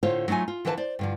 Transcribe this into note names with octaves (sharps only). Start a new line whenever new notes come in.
A2 D3 F4 C5 C#5 F5
F#3 A3 D#4 F4 G#5
F4
D3 E3 F3 B4 D#5 A5
C5 D5
G2 D3 F3